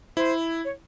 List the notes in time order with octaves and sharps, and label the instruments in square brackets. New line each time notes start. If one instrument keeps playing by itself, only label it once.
[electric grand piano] E4 [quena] C5
[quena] C#5